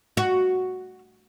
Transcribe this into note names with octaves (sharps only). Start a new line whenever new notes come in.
F#4